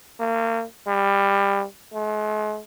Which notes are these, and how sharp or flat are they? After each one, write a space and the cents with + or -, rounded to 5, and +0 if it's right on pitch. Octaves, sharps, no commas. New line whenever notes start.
A#3 -35
G3 +20
G#3 +45